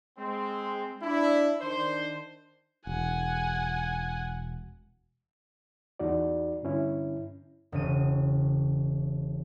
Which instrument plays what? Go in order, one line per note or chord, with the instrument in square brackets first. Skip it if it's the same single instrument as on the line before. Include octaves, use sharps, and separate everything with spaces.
[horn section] G#3 C4
D4 E4
D#3 D4 C5
[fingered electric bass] E1 [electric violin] F#5 G#5
[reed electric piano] E2 D#4 F#4 D5
G2 D3 C#4 E4
[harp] E1 C#3 D#7